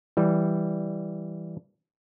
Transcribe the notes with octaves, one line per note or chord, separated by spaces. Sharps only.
E3 G3